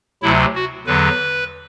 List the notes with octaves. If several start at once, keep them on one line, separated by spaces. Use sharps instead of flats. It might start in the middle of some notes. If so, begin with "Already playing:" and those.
D2 C3 F#3 E4
F#4
E2 D3 F#3 B4